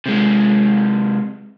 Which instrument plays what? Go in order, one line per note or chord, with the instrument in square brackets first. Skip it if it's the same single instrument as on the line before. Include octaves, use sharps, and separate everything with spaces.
[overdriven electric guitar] C3 G#3